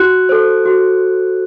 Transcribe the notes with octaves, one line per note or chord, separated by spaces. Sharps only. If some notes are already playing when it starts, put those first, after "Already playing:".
Already playing: F#4 F#6
A4 C5
F#4